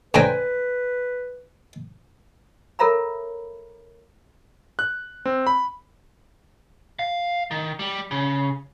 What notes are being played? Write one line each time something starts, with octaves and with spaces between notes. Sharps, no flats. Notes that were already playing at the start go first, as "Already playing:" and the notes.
A2 D4 B4 C5 G5 G#5 A#5
A4 A#4 C#5 E5 A#5 B5
F#6
C4
B5
F5
D#3
G3
C#3